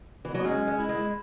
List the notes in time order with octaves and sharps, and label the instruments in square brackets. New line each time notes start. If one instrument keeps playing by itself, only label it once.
[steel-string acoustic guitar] E3
F#3
[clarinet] B3
[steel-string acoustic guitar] G#3 [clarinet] C#4
[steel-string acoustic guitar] G#3
[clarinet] E4
[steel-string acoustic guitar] G#3